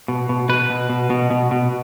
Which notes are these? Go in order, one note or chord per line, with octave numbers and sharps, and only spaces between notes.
B2
B2
B2 B4
B2
B2
B2
B2
B2